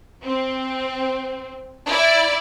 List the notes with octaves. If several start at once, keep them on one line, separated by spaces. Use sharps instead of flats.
C4
E4 D5